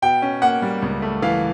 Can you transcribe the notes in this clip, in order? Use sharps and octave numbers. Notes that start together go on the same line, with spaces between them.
B2 G5
C#4
A#3 F#5
G3
C#2
A3
E3 F5